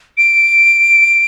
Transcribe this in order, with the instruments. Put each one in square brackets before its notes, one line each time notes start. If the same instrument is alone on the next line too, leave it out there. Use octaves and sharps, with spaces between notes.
[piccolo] D7